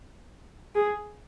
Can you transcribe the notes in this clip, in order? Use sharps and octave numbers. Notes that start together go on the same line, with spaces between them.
G#4